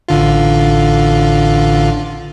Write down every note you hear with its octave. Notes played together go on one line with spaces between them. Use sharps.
A1 D3 F4